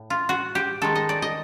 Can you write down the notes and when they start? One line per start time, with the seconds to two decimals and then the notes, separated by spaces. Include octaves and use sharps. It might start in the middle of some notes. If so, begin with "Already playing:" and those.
Already playing: A2
0.10 F4
0.29 F#4
0.55 G4
0.82 D#3 G#3 A4
0.95 D#5
1.09 D5
1.22 D#5